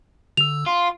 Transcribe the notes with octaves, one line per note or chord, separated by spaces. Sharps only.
D3 E6 F7
F4 F5 C6